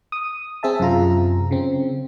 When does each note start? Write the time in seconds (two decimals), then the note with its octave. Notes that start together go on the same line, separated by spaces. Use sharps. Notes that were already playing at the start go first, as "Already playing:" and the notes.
0.12 D#6
0.63 C4 G#4 E5 A5
0.79 F#2 C3 F4 A#5
1.51 C#3 C4